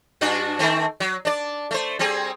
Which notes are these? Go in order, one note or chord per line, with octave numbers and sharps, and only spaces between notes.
G2 D4 F#4
D#3 A3 C4
F#3
D4 D5
A3 C5
G3 C4 G#4